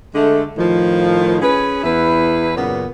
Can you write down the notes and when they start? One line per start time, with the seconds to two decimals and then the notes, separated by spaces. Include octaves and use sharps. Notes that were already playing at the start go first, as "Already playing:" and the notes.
0.15 D3 G#3 A3
0.57 A2 D#3 F3
1.42 C#4 G#4 B4
1.84 E2 E4 B4
2.57 F#2 A#2 C#3 B3